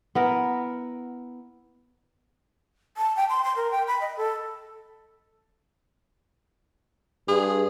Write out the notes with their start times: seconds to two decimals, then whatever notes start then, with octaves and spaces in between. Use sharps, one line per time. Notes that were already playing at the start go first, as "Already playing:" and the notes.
0.15 B3 E4 A#4
2.97 A5
3.17 G5
3.30 C6
3.44 C6
3.56 A#4
3.71 G5
3.87 B5
4.01 D#5
4.17 A4
7.28 G2 G#4